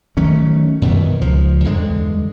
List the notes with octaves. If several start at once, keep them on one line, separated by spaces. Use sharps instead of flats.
D#3 F#3 A3 C#4
F#2 B2 D#3 E3
C#2 F3
E2 G2 D3 G#3